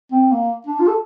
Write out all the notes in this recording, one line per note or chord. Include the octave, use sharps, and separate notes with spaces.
C4
A#3
D4
F4
A4